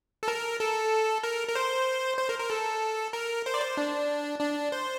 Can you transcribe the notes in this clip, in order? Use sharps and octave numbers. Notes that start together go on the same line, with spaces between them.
A4
A#4
A4
A#4
A#4
C5
C5
A#4
A#4
A4
A#4
C5
D5
C5
D4
D4
C5